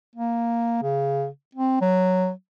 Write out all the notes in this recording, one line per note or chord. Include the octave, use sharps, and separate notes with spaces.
A#3
C#3
C4
F#3